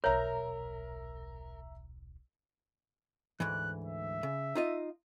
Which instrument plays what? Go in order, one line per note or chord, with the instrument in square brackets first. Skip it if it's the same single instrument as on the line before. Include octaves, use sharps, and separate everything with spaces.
[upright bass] D#1 B1 [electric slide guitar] A#4 [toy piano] C#5 [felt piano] E5 A#5
[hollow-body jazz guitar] D2 G#2 E3 [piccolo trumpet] F#6
[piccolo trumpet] E5
[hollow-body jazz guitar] C#3
D#4 F4 D#5